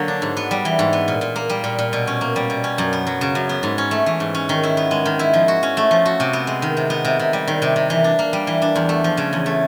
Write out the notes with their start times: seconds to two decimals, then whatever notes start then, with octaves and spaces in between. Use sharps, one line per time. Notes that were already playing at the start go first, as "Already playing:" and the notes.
Already playing: D3 F#3 A#3
0.08 D4
0.22 G#2
0.37 B3
0.51 G3
0.65 E3
0.79 G#2
0.93 B3
1.08 A#2
1.21 A#2
1.36 A#3
1.49 G3
1.64 A#2
1.79 A#2
1.93 B2
2.07 C#4
2.21 A#3
2.36 G3
2.50 B2
2.64 C#4
2.78 F#2
2.93 B3
3.07 F#3
3.21 C#3
3.35 F#2
3.49 B3
3.63 G#2
3.78 C#4
3.91 A3
4.06 E3
4.20 G#2
4.35 C#4
4.49 D#3
4.63 E4
4.77 B3
4.91 G#3
5.05 D#3
5.19 E4
5.34 F3
5.48 F#4
5.63 C#4
5.77 A3
5.91 F3
6.05 F#4
6.20 C3
6.33 B3
6.47 G#3
6.62 D#3
6.77 C3
6.90 B3
7.05 C3
7.19 C3
7.33 G3
7.48 D#3
7.62 C3
7.76 C3
7.90 E3
8.04 D4
8.19 A#3
8.33 G3
8.47 E3
8.62 D4
8.76 E2
8.89 A3
9.04 F3
9.17 C#3
9.33 E2
9.46 A3